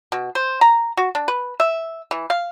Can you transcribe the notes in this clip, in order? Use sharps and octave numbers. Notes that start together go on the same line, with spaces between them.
B2
C5
A#5
F#4
D4
B4
E5
E3
F5